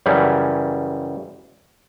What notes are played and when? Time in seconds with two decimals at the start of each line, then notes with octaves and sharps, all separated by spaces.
0.06 F#2 C#3 E3 G3 C#4